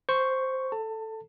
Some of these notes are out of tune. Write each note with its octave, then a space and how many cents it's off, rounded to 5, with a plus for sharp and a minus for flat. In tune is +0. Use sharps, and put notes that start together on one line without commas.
C5 +0 C#6 +0
A4 +0 A5 +25